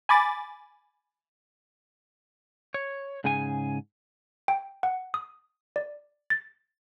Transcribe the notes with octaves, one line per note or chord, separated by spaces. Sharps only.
G#5 B5 D6 A6
C#5
G#2 C#3 G#4 G#5
G5
F#5
D#6
D5
A6